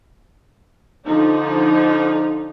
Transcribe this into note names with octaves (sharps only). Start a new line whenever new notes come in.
D3 F3 D#4